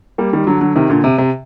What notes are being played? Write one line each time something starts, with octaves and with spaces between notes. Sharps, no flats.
G3 A#3
D#3 G3
D3 F#3
D3 F#3
C3 D#3
A#2 D3
C3
C3